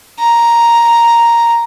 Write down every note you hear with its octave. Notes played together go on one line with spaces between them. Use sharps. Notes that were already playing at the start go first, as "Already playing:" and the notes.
A#5